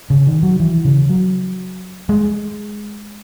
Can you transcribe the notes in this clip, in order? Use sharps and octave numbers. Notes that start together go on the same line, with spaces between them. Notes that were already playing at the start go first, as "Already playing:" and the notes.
C#3
D#3
F#3
E3
C#3
F#3
G#3